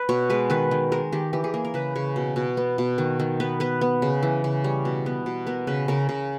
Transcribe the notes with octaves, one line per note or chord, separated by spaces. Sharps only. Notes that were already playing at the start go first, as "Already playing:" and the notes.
Already playing: B4
B2 C#5
G#3 B4
D#3 B4
D#3
G#3 A#4
D#3 G4
E3 G4
G#4
A#3 A#4
A#4
C#3 B4
C#3 C#5
B2
B2
B3
B2
D#3
D#3
B3 B4
B3 B4
B3
C#3
E3
C#3
G3 C#5
B2
B3
B2
B3 A#4
C#3 B4
C#3 A#4
C#3